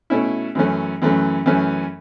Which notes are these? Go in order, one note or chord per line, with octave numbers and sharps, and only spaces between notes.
B2 A3 C#4 E4
F#2 E3 A3 C#4
F#2 E3 A3 C#4
F#2 E3 A3 C#4